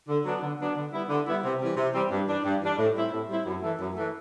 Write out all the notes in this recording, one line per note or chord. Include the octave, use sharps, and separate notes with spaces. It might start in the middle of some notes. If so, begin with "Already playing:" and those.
D3
F#3 B3 D4
D3
F#3 B3 D4
D3
G3 B3 E4
D3
G3 B3 E4
C3
E3 G3 C4
C3
E3 G3 C4
G2
E3 G3 D4
G2
E3 G3 D4
A2
G3 C4 E4
A2
G3 C4 E4
F#2
E3 A3
F#2
E3 A3